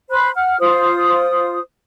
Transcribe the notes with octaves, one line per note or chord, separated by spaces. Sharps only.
C5 B5 F#6
F#5 F6
F4 C5 D#6